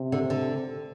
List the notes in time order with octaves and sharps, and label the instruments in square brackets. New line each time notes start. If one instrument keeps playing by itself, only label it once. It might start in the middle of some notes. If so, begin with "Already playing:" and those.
Already playing: [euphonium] C3
[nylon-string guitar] D3
D3